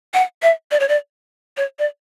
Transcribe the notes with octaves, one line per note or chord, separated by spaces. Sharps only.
F#5
E5
D5
C#5
D5
C#5
D5